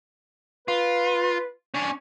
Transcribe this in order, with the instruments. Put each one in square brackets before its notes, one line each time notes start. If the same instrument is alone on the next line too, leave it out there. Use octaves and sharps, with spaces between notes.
[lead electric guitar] F4 [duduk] B4
[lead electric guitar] C#4 D4